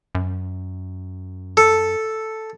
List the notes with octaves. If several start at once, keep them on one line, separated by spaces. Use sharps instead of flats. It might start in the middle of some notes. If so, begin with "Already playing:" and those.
F#2
A4